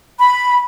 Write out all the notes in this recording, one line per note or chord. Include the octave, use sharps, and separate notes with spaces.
B5